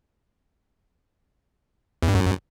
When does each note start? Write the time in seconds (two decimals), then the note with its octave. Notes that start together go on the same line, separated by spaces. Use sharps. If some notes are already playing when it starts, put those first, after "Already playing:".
2.02 E2
2.09 G2
2.15 F#2